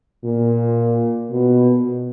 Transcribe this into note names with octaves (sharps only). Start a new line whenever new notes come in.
A#2
B2